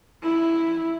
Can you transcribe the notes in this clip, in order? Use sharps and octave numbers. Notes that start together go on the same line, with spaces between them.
E4